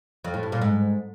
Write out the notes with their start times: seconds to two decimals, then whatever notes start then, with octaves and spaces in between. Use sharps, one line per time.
0.24 F2
0.34 A2
0.43 G2
0.52 A#2
0.62 G#2